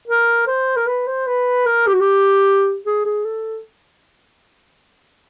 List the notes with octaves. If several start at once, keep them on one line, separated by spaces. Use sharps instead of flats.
A#4
C5
A#4
B4
C5
B4
A#4
G4
F#4
G4
G#4
G#4
A4